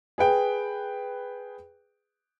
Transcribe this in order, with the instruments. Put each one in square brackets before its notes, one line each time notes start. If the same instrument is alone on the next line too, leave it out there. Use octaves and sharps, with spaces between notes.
[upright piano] G#4 B4 G5